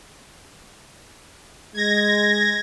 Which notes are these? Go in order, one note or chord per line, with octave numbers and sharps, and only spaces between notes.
G#3 G#6 A#6